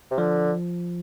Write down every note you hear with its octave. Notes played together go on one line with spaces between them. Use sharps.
C3
D3 F3